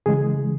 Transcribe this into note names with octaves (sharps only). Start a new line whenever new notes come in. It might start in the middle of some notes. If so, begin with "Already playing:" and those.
C#3 E3 G#3 G#4